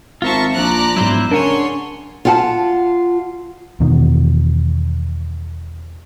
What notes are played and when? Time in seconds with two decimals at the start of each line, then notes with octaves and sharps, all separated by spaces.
0.22 G#1 F4 A#4 C5 E5 A5 C#6
0.55 A#1 F3 D5 A#5 F#6
0.96 E1 G#2 F#3 E4 C5 C6
1.31 C#3 D4 A#4 C#5 F#5 G#5 C6
2.25 F4 F#5 A5
3.80 E2 B2 D#3